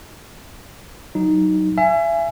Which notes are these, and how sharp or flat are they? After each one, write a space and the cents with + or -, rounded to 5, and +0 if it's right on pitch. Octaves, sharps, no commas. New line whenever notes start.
F#3 +15 D#4 +0
E5 +35 G#5 +0